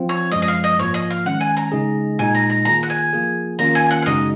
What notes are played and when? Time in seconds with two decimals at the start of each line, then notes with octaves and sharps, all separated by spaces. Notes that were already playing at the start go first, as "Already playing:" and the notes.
Already playing: F3 C4 F4
0.09 C#5
0.32 F#2 F3 G#3 D#5
0.42 D#5
0.48 F5
0.64 D#5
0.79 G#2 F3 A#3 F4 C#5
0.94 D#5
1.11 F5
1.26 D#3 G#3 C#4 F#5
1.41 G#5
1.57 A#5
1.72 C#3 G#3 D#4 G#4
2.19 A#2 G#3 D#4 G#5
2.35 A#5
2.50 A#5
2.65 D#3 A#3 F4 G#4 A#5
2.83 F#5
2.90 G#5
3.13 F3 A#3 F4 G#4
3.59 D#3 A#3 C#4 F4 A#5
3.75 G#5
3.91 F#5
4.02 F5
4.06 F#2 C#3 G#3 D#4 F#4 D#5